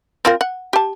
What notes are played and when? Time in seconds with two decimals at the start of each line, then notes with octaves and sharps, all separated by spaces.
0.25 C4 F4 A#4
0.41 F#5
0.73 G4 A5